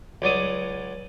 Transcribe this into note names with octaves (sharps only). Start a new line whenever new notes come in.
C#2 F#3 D5 D#6